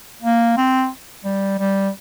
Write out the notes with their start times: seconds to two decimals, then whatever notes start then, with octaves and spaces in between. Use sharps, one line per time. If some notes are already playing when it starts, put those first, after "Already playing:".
0.22 A#3
0.57 C4
1.25 G3
1.59 G3